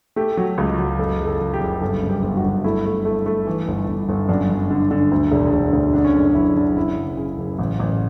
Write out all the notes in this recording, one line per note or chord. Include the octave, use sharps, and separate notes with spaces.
A3 G4
F#3
C#2
F#3
F#1 A4
F#1
A4
F#1
G4
F#1
G1 A4
G2
G4
G1
F#4
G1
A3 E4
A3
A3
A3
E3
G1
G1
G1
F#2 D4
F#2
D3
D3
D2
E1
E1
D2
D3 D4
C#4
F#1 D4
F#1 E4
F#1 D4
C#3 E4
F#1
C#3
F#1
A1
A1